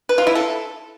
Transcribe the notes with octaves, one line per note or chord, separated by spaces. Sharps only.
B4
F4
E4
A4